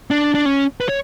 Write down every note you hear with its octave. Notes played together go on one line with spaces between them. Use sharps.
D4
D4
C#4
B4
C#5